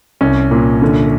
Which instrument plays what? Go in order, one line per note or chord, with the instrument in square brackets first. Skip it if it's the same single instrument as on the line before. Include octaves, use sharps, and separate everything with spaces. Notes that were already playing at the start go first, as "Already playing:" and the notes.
[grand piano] C2 C#4
A#2
D3